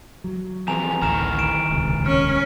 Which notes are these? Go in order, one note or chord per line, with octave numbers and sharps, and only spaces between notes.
F#3
E3 F3 C4 G#5 A#5 F7
A1 D2 D#3 E4 A#5 F6 E7
D7 E7
D#1 C#2 C3
C#4 F6